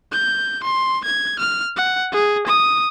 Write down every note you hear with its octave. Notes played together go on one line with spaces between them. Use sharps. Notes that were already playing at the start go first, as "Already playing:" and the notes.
G6
C6
G#6
F6
F#5
G#4
D#6